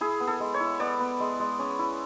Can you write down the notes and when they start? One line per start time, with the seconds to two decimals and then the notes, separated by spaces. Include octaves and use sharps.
0.01 E4 G#4
0.20 B3
0.27 A4
0.40 G#3
0.54 C#5
0.60 E4
0.80 B3 D5
1.00 B3
1.20 G#3
1.40 G#3
1.59 C#4
1.79 E4